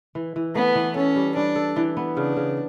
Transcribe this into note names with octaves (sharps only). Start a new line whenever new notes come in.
E3
E3
A3 B3
E3
C#4 A4
G3
G3 D4
A4
E3
B3
C#3 D4
C#3